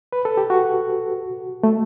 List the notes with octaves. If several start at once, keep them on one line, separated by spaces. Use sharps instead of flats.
B4
A4
G4
F#4
A3